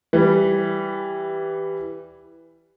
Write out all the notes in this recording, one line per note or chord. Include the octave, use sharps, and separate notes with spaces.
E3 G3